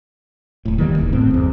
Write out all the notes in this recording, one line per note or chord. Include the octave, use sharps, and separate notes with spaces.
D#1 A2
D#3 E3 G3 A#3
D1 A1 E2
A2 C4
G1 E2